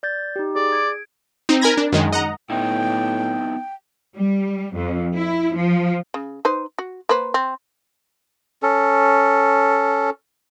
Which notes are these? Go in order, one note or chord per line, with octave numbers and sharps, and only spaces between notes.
D5 G6 A6
D#4 G4
G#4 D5
G#6 D7
C4 D#4
A#4 G#5 B5 G#6 A#6
D4
F#2 D#3 G#3
D#5 F#5 A#5
A2 B3 D#4 E4 G5
G3
F2
E4
F3
C#3
D#4 B4 C5
F#4
A#3 B4 C5
C4
C#4 A4